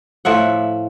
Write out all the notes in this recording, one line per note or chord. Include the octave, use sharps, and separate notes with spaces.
A2 F3 E5 F#5